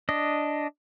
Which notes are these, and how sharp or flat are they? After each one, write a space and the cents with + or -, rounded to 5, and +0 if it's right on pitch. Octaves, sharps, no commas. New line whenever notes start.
D4 +0 D#5 +0